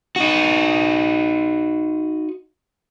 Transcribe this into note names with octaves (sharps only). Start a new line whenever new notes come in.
D#4 F#4